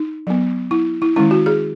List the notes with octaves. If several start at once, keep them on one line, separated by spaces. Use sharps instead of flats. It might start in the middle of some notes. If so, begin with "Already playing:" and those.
Already playing: D#4
F#3 B3
E4
E4
D#3 G#3 C#4 E4
F#4
G#4